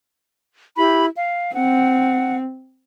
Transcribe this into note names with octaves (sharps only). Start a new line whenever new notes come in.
E4 G4 B5
F5
C4 F#5